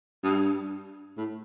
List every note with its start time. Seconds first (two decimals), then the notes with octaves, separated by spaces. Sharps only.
0.23 G2
1.17 A2